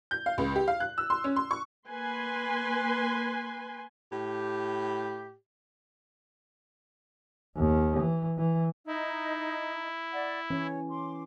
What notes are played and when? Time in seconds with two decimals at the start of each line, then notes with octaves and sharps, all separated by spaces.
0.11 G6
0.26 F5
0.38 C#2
0.55 G4
0.68 F5
0.80 F#6
0.98 E6
1.10 C6
1.24 C#4
1.36 C6
1.51 C#6
1.87 A#3 B4 G#5 C6
4.12 A2 G4
7.57 D#2
8.00 E3
8.38 E3
8.87 D#4 E4
10.13 D5 F#5
10.50 E3 C#4 C#5
10.90 C6 D6